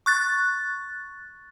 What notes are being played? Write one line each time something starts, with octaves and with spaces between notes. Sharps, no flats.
C#6 F#6 A6